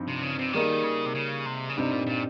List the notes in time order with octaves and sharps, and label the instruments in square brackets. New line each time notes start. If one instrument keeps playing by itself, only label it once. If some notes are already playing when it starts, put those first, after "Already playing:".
Already playing: [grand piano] G2 F3 C4 D#4
[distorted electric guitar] C3
C#3
C3
[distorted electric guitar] D#3 [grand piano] G3 A#3 D#4 G#4
[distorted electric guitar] C#3
C3
C#3
C3
C#3
[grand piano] G2 G3 C4 D#4 [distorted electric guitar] C3
[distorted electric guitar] A#2
A#2